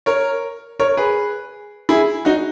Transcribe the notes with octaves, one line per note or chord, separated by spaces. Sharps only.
A#4 C#5
A#4 C#5
G#4 B4
E4 G#4
D#4 F#4